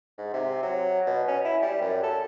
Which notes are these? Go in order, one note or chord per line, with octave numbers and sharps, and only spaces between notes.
G#2
C3
F#3
B2
C#4
E4
G3
F#2
A4